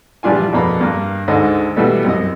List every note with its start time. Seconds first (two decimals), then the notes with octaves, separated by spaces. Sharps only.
0.23 A#1 E3 G3 D4 F4 G#5
0.52 A#1 F2 B2 A#3 B3 B5
0.81 G2 A#3
1.28 D2 G#2 D3 D#5
1.76 B2 E3 G3 A3 B3
2.04 C2 F#2 D#5